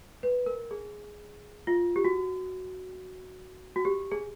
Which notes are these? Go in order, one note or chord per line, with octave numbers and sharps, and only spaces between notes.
B4
A#4
G#4
F4
G4
F#4
F#4
G4
G#4